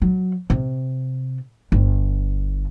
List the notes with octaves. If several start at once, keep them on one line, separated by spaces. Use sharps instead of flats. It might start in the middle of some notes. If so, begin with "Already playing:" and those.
F#3
C3
G1